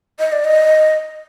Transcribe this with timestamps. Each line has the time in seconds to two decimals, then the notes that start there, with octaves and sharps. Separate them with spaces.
0.19 D#5
0.32 D5
0.44 D#5